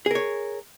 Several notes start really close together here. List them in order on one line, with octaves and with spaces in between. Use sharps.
G#4 A#4 C#5